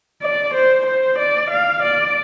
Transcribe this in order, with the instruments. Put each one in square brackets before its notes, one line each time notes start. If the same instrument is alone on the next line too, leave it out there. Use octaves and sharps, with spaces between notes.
[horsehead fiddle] D5
C5
C5
D5
F5
D5